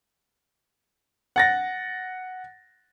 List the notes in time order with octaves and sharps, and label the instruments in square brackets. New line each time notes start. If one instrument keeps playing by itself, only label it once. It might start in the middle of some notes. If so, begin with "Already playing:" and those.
[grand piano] F#5 A6 A#6